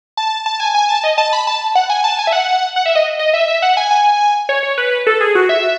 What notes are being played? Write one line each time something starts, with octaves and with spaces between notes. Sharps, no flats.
A5
A5
G#5
G#5
A5
D#5
A5
B5
A5
F#5
G#5
A5
G#5
E5
F#5
F#5
E5
D#5
D#5
E5
E5
F#5
G#5
G#5
C#5
C#5
B4
A4
G#4
F#4
E5